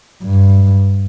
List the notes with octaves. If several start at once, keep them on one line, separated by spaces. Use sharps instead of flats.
G2